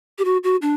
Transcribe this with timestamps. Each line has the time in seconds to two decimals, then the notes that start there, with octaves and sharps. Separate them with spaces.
0.18 G4
0.25 F#4
0.43 F#4
0.62 D4